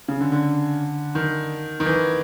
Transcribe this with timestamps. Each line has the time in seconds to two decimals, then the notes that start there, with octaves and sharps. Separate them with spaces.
0.08 C#3
0.20 D3
0.32 D3
1.15 D#3
1.80 D#3
1.86 E3